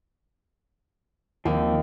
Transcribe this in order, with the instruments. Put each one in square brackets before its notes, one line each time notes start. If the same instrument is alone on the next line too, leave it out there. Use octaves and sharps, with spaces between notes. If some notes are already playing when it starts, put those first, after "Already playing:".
[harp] D#2 [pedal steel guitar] F3 A#3 C4